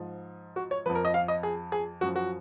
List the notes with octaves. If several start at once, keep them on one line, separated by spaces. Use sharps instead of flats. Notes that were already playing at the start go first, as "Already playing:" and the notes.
Already playing: G#2 F3
F#4
C#5
F2 F3 B4
A#4
D#5
F5
D#5
G#4
G#4
F#2 F3 F#4
F#4